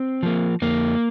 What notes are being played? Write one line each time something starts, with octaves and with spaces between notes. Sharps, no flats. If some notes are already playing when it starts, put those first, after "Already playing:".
Already playing: C4
F3 A#3
F2 A#3